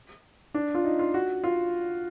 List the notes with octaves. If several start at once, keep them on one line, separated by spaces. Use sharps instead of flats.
D4
F4
D#4
F4
F#4
F4